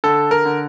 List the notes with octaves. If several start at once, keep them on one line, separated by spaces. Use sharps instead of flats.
D3 A4
A#4
D3